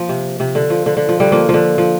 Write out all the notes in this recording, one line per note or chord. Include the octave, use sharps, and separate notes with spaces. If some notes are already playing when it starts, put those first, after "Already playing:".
Already playing: F3 A#3
C3
C3
D3
F3
D3
D3
F3
D3 G3
F3 A#3
F3
D3
F3